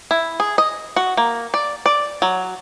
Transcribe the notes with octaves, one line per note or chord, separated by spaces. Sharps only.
E4
G#4
D#5
F#4
A#3
D5
D5
F#3